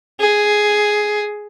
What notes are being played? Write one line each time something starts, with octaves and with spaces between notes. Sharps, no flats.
G#4